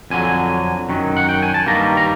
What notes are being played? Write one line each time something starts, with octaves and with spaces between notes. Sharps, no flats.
F2 D3 F#3 G#5
F#2 D#3 F#3
F#5
G5
G#5
A5
G2 D#3 G3 A#3 A#5
A#5